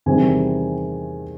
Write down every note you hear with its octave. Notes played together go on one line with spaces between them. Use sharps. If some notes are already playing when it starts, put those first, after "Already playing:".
E2 C3 D#3 G3 G#5